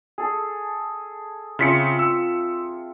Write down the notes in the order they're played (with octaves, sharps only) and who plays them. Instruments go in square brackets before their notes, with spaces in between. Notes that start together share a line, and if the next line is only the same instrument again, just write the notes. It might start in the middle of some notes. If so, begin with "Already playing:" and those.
[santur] G#4 A4
[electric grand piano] C#3 B6 C#7 [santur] C4 F4 E5
[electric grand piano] E6